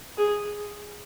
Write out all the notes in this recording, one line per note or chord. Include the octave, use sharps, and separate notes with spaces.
G#4